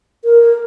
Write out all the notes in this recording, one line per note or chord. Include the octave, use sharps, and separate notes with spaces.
A#4